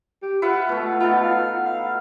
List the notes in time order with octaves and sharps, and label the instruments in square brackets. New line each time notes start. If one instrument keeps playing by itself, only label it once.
[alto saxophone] G4
[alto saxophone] F4 [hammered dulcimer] B4 E5 F#5
[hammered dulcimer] B2 A3
[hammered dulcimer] B3 D#4 A4 [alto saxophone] F4
[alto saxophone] F5
F5